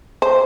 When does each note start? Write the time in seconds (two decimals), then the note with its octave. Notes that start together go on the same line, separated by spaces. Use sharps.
0.22 C5